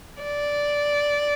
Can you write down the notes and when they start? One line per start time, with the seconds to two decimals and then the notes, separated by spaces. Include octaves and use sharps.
0.22 D5